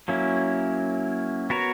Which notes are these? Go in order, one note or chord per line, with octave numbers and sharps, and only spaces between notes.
F#3 A#3 C#4 E4
B3 F#4 A#4 C#5